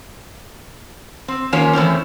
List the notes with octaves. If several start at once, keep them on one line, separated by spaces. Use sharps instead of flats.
C4
D#3 F3 A#3 C#4 C#5
E3 A3 C4 C#4